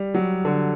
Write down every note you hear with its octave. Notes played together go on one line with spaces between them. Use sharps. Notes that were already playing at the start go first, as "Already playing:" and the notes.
Already playing: G3
F#3
D3